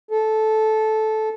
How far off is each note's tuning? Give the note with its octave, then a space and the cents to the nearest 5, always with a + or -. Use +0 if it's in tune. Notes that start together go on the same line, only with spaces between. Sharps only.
A4 -15